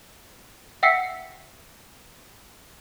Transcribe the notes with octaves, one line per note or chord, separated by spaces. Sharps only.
E5 F#5 G5 E6 B6 C#7